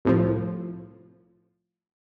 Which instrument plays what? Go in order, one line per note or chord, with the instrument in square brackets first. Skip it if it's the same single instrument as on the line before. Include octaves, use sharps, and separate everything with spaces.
[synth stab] C2 A2 F3